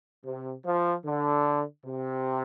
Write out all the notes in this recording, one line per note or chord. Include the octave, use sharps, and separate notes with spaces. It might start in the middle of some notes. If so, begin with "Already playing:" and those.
C3
F3
D3
C3